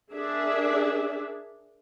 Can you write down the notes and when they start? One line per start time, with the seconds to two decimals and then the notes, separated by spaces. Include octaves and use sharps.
0.10 D4 G#4 A#4 E5